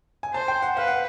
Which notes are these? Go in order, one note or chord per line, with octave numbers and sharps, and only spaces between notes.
G#5
C5 A5
G5
F#5
B4 F5
F#5